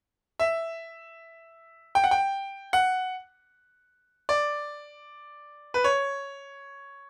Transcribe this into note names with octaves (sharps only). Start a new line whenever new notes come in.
E5
G5
F#5
G5
F#5
D5
B4
C#5